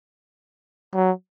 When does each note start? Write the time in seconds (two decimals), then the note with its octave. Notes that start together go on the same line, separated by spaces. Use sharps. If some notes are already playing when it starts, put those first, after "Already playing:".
0.94 F#3